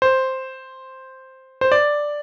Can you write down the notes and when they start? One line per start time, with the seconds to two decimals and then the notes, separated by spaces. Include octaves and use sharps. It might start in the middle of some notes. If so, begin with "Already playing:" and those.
0.02 C5
1.61 C5
1.72 D5